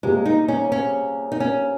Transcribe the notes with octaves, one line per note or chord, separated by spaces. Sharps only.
C3 G3 G#3 A#3 F4 G#4
D#4
C#4
C#4
D#4
C#4